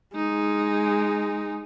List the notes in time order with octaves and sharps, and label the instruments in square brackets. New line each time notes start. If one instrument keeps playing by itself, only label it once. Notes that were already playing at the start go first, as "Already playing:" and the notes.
[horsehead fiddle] G#3 [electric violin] D#4